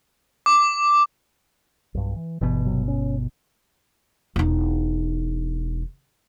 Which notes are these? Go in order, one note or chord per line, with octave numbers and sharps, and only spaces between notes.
D6
B1 G2
E3
G1 B2 E3
C3 F#3
C#4
E1 D#4